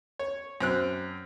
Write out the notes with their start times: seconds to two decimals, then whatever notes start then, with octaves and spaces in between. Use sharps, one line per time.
0.19 C#5
0.61 F#2 C4 F#6